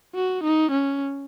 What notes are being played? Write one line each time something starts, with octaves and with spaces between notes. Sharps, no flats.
F#4
D#4
C#4